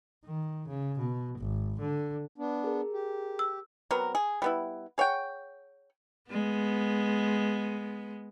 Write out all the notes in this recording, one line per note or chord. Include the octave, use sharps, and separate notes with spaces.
D#3
C#3
B2
G#1
D3
B3 D4
G#4 A#4
G4
E6
F#3 B3 C4 A#4
G#4
G3 B3 E4
G#4 C#5 F#5 G5
G#3 B3